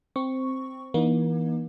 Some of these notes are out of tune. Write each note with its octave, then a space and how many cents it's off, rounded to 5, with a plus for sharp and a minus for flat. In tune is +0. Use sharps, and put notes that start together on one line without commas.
C4 +0 C#6 +0
E3 +0 A#3 +45 D#4 +0